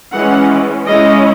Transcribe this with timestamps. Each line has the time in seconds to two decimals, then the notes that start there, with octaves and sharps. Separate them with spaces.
0.14 E3 G#3 C#4 F#5
0.86 G#3 C#4 E4 D#5